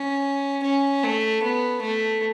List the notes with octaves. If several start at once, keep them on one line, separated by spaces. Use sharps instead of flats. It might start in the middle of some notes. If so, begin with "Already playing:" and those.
Already playing: C#4
C#4
A3
B3
A3